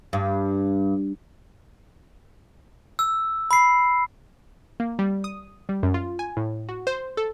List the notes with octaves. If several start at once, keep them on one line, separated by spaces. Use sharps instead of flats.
G2
E6
B5 C7
A#3
G3
D#6
G3
F#2
F4
G#5
A2
F#4
C5
A4